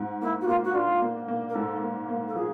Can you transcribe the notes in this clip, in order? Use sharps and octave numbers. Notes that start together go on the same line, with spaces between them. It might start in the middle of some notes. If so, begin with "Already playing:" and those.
Already playing: G#2
A#3 E4
F#4
A#3 F4
F#4
D4 F4
A#3
A#3
A#4
G#2 A4
A#3
A#3
A4
F3 G#4